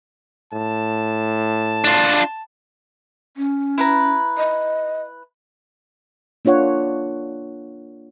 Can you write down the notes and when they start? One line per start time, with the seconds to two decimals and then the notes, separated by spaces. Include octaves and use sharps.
0.53 A2 A5
1.84 D4 F4
3.37 C#4
3.78 E4 B4 A#5
4.38 D#5
6.45 A#3 D4 F4 C#5 F#5